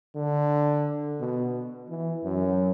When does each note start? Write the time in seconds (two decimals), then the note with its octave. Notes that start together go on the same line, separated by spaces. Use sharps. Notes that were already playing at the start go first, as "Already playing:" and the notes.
0.15 D3
1.20 B2
1.89 E3
2.24 F#2